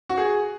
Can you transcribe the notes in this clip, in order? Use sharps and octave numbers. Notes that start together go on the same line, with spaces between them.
F#4
G#4